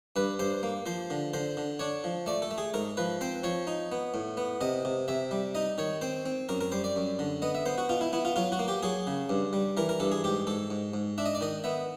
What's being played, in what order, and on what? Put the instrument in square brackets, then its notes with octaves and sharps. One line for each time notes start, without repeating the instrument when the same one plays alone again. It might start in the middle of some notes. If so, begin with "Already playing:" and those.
[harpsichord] G2 B4
G2 C5
A#3
F3 C5
D3
D3 C5
D3
D4 C#5
F3
A3 D5
A4
A3
G#4
G#2 A#4
F3 B4
C4 C5
F3 C#5
D#4
B3
A2
B3
C3 D#5
C3
C3 E5
G3
D#4 D#5
D#3 C#5
C4 C5
C4
F#2 A#4
A#4
G3 C5
D5
F#2
D3
B3 D#5
E5
B3 C5
F#4
B2 F4
E4
B3 E4
F4
F#3 F4
F#4
A#3
G4
F#3 G#4
C#3
G2
G3
E3 A#4
A#4
G2 A4
G#4
G#2 G4
G#2 A4
G#2
G#2
D4 E5
D#5
D5
D#3 D#5
B3 E5